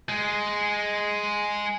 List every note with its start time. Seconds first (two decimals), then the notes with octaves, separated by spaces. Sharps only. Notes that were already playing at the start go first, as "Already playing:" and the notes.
0.09 G#3